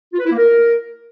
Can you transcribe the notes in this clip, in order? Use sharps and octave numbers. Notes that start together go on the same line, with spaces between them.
F4
B4
E4
A#3
A#4